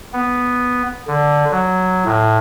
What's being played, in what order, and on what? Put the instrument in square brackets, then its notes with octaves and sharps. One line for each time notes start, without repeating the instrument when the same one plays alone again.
[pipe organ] B3
D3
F#3
A2